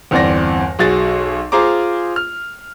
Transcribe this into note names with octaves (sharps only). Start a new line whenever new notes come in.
G1 E2 C4 D5 A#6
B1 F#4 G#4 A6
F4 G#4 C5 A#5 D6
F6